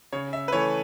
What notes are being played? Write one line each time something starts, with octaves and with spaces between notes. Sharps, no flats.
C#3 C#5
E5
B4
E3 A3 C#5